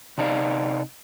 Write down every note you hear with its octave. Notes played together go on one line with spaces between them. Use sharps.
C3 D4 D#4 D5 F5